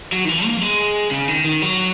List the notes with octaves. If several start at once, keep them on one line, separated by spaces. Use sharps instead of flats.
F#3
D#3
E3
A#3
F#3
G#3
C#3
D#3
D#3
F#3